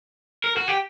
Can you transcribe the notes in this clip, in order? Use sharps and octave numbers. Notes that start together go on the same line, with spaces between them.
A#4
F#4
G4